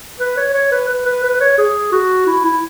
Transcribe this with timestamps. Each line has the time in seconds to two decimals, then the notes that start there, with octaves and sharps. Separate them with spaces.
0.20 B4
0.37 C#5
0.53 C#5
0.72 B4
0.88 B4
1.06 B4
1.23 B4
1.35 B4
1.40 C#5
1.58 G#4
1.92 F#4
2.27 E4
2.44 E4